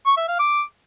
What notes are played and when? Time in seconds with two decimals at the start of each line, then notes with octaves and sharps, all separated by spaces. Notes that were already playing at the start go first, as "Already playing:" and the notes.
0.06 C#6
0.17 E5
0.28 F5
0.39 D6